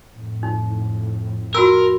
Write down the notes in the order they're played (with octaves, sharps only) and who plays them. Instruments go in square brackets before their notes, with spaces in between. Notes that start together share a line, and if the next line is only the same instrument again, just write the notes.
[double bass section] F2 A2
[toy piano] D#4
[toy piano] F#4 B5 E6 [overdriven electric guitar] A#4